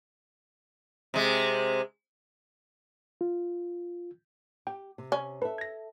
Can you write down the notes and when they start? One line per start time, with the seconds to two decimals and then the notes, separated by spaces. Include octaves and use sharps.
1.14 C3 G#3
3.21 F4
4.67 G4 G5
4.98 C3
5.12 C#4
5.42 A4 B4 E5
5.58 G#6 A#6